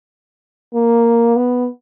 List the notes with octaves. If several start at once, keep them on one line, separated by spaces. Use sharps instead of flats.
A#3
B3